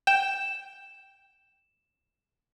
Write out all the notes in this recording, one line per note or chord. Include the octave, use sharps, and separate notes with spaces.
G5 E7